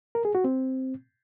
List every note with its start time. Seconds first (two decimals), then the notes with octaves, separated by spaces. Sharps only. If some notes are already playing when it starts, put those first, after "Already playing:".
0.15 A#4
0.25 G#4
0.35 F#4
0.44 C4